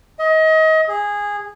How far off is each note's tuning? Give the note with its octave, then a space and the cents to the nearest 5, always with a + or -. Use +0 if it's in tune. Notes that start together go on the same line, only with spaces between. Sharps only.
D#5 +30
G#4 -15